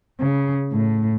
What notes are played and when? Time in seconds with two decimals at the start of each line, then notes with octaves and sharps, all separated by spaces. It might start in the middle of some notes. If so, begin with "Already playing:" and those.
0.20 C#3
0.72 A2